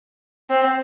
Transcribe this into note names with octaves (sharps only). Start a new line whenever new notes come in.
C4